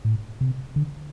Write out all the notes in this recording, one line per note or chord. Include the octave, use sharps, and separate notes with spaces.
A2
C3
D3